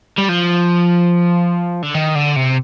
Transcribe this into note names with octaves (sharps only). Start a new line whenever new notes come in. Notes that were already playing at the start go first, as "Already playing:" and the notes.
G3
F3
D3
D#3
D3
C3